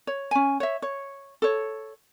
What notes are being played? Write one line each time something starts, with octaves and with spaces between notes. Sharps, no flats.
C#5
C#4 G#5
C#5 E5
C#5
A4 C#5